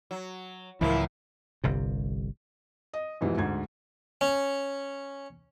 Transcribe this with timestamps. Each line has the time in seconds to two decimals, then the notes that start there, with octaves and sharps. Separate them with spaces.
0.11 F#3
0.81 C#2 F#2 A2 E3 F3 A#3 E4
1.64 G1 C2 C3
2.93 D#5
3.21 F2 G#2 B2 E3 G3
3.38 D2 G#2 G#6
4.21 C#4